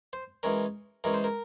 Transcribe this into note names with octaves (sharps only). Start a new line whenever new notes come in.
C5
E3 G#3 C#4 A#4
E3 G#3 C#4 A#4
C5
A#4